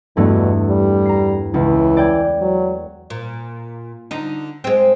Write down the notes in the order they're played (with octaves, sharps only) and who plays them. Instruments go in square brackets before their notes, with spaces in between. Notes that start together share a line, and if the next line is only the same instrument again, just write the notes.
[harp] E2 G2 A3 [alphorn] B2
[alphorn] G3
[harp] A#5 C7
[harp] C#2 C#3 [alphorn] E3
[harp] D5 G5 G#6
[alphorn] F#3
[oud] A#2
D3 D#4
G#3 C4